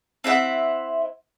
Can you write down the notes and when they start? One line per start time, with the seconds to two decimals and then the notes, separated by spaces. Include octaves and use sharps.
0.24 C4 E4 E5 F#5